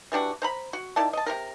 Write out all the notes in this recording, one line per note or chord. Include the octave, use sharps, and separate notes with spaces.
E3 G3 D4 F#4
C5 A#5 B5
F#4
D#3 E4 D5 A5
D#5 A5
C3 F3 A#4